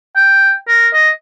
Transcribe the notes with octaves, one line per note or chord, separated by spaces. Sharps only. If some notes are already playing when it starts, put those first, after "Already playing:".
G5
A#4
D#5